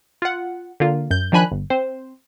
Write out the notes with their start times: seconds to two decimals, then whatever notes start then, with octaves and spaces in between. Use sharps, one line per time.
0.22 F4 F#5
0.80 D3 A#3 F4
1.11 F#2 G6
1.32 D#3 F3 D4 G#5 B5 F#6
1.52 G1
1.70 C4 C5